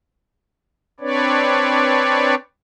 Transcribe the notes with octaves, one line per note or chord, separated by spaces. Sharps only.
C4 D4 B4 C#5 D5